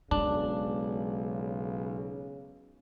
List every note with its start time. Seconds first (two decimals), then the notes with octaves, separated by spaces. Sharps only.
0.11 B1 C#3 G#3 D4